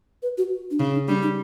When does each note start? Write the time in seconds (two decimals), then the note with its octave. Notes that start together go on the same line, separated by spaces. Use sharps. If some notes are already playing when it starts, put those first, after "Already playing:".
0.23 B4
0.38 F#4
0.71 D4
0.79 C#3 D#4
0.94 D4
1.07 G3 D4
1.22 D#4